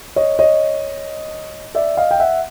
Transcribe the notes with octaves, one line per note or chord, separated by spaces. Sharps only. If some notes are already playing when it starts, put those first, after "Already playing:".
C#5 D#5
C#5 D#5
D5 E5
D#5 F5
G5
E5 F#5